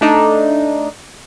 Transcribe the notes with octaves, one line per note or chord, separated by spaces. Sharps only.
A3 D4 D#4